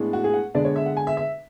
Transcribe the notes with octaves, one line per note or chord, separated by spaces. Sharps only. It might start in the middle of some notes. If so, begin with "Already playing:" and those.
Already playing: A2 G#3 B3 D4
F#4
G#4
F#5
D3 G#3 B3 D4 D5
C#5
E5
F#5
G#5
E5
E5